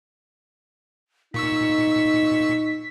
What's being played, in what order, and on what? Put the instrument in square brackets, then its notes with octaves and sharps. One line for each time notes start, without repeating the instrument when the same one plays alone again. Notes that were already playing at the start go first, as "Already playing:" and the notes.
[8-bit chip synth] A#2 C#6 E6 [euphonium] D#4 [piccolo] B6